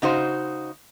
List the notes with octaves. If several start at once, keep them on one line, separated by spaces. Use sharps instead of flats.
C#3 D#4 F#4 C5